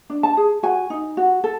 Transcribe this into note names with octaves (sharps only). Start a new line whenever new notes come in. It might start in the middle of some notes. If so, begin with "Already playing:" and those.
D4
A5
G#4
F#4 G#5
D#4
F#4
A4